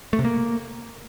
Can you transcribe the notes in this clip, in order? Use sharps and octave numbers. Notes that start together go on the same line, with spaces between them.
A3
C3
A#3